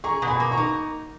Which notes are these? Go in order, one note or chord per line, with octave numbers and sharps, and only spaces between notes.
G#4 A#5 C#6
B2
G#5 B5
A#3
A#5 C#6
D#4